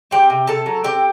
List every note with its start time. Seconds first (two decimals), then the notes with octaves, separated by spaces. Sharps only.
0.11 C4 G4 G5
0.30 C3
0.47 C3 A4 A5
0.66 F#3
0.84 C4 G4 G5